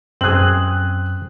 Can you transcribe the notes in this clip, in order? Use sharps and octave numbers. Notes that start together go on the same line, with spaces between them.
F#2 C4 G#4 F#6 F#7